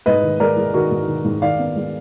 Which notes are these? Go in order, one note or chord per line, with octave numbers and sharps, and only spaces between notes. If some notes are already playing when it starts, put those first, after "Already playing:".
G#2 B4 D#5
D#3
G#3 A#4 D5
G#3
D#3 F#4 A#4
G#2
D#3
G#2
D#3 D5 F5
B3
G#3